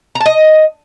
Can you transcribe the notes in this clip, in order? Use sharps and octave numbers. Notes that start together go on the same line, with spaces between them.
A#5
A5
D#5